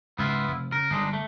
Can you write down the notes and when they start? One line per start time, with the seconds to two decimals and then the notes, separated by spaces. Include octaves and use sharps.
0.18 C#2 G#2 B3 E4 F4
0.48 F1
0.72 C#3 A#4
0.91 G1 G#3 D4 D#4
1.13 A3